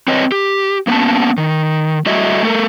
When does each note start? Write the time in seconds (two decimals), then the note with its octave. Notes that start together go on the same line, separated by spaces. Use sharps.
0.08 C4 B4 C#5 D#5
0.32 G4
0.87 A#3 B3 C#4 F#5 A5
1.38 D#3
2.06 G3 A3 F#4 D#5 E5
2.43 A3 A4 A#4